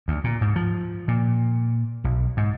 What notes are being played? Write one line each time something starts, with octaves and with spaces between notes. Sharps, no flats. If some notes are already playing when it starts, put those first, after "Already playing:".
D2
A#2
G#2
F3
A#2
B1
G#2